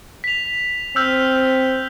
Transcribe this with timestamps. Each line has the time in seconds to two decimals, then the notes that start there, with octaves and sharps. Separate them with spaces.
0.24 B6 F7
0.96 C4 E6 F6 G6